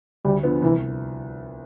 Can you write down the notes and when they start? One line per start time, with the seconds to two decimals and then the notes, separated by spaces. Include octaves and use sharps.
0.25 D2 G3
0.43 D3 F3 B3
0.62 C2 E3